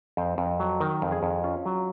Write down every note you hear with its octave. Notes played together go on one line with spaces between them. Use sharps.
F2 C5
F2
F#3
D#3 A#4
F2
G#4
F2
C#4 F4
F#3